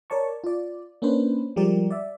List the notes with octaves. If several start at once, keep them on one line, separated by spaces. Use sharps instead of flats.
A#4 C#5 D5 A5 C#6
F4 D5
A#3 C#4 D4 B4 C5
F3 G3 G#3 G4 A#4 D5
D5 E5